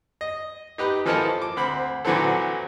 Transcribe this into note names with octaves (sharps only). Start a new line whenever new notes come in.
D#5
D#4 G4 B4
E3 F3 A#3 A4 D#5 A5
D6
D2 C4 B5
A#2 D3 E3 F#3 C4 A4